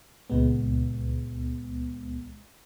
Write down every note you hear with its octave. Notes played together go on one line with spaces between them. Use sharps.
C#2 A#2 G#3 B3